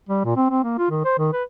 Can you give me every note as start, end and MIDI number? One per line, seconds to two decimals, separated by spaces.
0.09 0.21 55
0.25 0.36 46
0.36 0.46 60
0.50 0.63 60
0.63 0.76 58
0.78 0.87 65
0.90 1.03 51
1.05 1.14 72
1.18 1.28 51
1.32 1.43 71